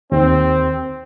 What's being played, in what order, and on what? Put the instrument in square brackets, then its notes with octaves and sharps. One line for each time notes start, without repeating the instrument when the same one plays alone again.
[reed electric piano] D#2 [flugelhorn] C4